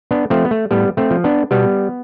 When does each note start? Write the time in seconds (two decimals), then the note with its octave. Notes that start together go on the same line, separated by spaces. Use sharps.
0.11 B3 D4
0.30 F3 A3 C4
0.45 B3
0.51 A3
0.71 A2 G3 B3
0.97 A3 C4
1.11 F3
1.24 B3 D4
1.51 B2 G3 B3